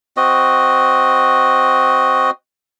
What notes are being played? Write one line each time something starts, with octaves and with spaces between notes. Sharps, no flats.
C4 F#4 D#5